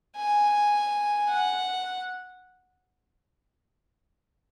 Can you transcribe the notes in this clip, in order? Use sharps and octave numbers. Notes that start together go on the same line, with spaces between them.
G#5
F#5